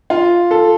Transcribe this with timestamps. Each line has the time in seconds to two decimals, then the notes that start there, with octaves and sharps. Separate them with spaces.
0.10 F4
0.51 A4